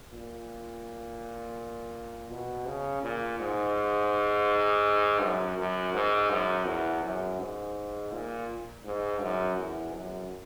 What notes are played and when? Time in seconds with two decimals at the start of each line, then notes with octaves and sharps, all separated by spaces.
0.12 A#2
2.30 B2
2.66 C#3
3.02 A#2
3.39 G#2
5.21 F#2
5.58 F#2
5.94 G#2
6.30 F#2
6.66 E2
7.03 F#2
7.40 G#2
8.12 A#2
8.85 G#2
9.21 F#2
9.58 E2
9.94 F#2